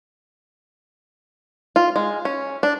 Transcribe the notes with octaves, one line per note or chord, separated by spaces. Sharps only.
F4
G#3
C#4
D4